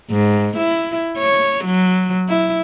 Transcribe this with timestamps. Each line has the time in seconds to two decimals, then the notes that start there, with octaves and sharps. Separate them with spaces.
0.11 G#2
0.57 E4
1.18 C#5
1.65 F#3
2.29 E4